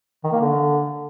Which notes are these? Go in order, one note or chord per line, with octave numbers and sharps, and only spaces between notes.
D#3
A#3
D3